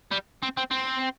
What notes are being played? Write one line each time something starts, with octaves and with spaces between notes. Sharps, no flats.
G3
C4
C4
C4